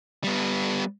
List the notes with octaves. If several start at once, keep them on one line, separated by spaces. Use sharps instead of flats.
G3 B3